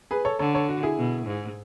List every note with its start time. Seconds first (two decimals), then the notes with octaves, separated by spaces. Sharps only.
0.11 G#4 B4
0.25 A4 C#5
0.39 D3 A4 C#5
0.54 A4 C#5
0.69 F#4
0.83 E4 G#4
0.98 B2
1.27 G#2